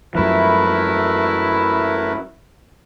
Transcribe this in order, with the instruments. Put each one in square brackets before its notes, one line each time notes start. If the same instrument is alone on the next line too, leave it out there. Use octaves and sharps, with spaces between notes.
[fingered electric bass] F#2 F3 [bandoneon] A3 A#4 B4 [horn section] E4